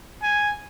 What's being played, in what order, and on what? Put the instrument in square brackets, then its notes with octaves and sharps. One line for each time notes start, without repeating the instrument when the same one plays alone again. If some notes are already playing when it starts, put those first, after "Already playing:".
[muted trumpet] G#5